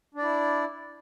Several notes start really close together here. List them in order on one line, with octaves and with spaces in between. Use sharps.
D4 D5 E4